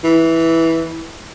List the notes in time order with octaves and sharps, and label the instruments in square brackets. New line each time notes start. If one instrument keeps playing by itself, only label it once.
[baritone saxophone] E3